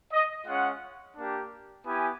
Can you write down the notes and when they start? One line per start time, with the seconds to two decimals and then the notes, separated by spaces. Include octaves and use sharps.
0.12 D#5
0.46 G#3 C#4 F4 F#5
1.16 A#3 D4 G4
1.84 B3 E4 G4 G#5